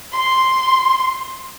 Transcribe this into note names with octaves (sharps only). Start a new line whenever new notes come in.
C6